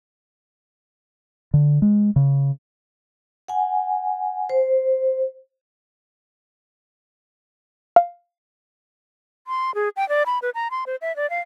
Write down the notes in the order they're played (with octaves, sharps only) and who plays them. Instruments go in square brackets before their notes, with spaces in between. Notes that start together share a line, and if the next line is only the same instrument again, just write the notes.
[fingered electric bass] D3
G#3
C#3
[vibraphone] F#5 G#5
C5
[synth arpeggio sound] F5
[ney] C6
G#4
G5
D5
B5
B4
A#5
C6
C5
E5
D5
F5